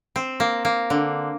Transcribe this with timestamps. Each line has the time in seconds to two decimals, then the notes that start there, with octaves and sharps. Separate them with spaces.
0.16 C4
0.40 A#3
0.65 A#3
0.90 D3